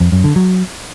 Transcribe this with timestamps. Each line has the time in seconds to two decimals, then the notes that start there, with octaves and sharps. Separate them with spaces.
0.01 F2
0.12 F#2
0.24 D3
0.36 F#3